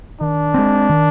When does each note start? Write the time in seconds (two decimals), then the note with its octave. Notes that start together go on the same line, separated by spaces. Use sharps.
0.21 D#3 D4
0.54 G#3 C4
0.89 D#3